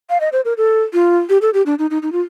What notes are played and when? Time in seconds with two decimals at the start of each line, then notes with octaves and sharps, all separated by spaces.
0.10 F5
0.21 D#5
0.32 C5
0.45 A#4
0.57 A4
0.93 F4
1.29 G4
1.42 A4
1.54 G4
1.66 D4
1.79 D#4
1.91 D#4
2.02 D#4
2.12 F4